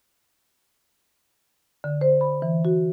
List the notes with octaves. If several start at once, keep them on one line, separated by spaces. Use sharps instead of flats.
D3
C5
B5
E3
F#4